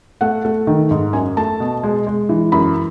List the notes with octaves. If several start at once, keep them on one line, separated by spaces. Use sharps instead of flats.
A3 F#5
A3
D#3
G#2
F#2 G#5
A3 A5
B2
G#3
G#3
E3
F#2 B5